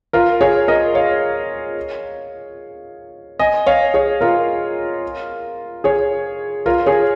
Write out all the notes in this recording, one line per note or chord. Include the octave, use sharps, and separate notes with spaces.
F4 A#4
G#4 C#5
A#4 D#5
C#5 F5
D#5 G#5
C#5 F5
G#4 C#5
F4 A#4
G#4 C#5
F4 A#4
G#4 C#5